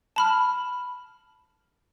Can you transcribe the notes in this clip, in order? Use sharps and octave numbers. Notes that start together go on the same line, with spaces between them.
A5 B5 F6